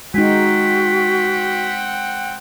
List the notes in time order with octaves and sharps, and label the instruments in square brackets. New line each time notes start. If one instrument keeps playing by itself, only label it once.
[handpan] G#3 D#4 [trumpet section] C4 F#5 G5 [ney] F#4 [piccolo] B6